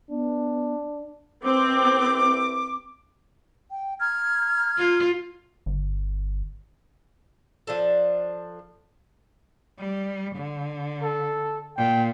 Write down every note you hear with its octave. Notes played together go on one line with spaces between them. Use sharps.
B3 D4
C2 C4 B4 D6
G5
A#5 F6 G#6
F4
G1
F3 D4 A4
G3
D3
A4
A#2 G5